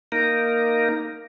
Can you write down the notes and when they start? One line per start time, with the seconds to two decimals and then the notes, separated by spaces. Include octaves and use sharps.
0.12 A#3 D#4 A#4